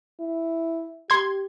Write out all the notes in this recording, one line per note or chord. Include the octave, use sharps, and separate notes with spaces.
E4
G4 C6 G#6